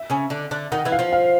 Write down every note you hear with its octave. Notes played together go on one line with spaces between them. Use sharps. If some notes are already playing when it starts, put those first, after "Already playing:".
Already playing: E5
C#3 C#4
D3 D4
D3 D4
D#3 D#4 F#5
E3 E4
F5
F3 F4
F5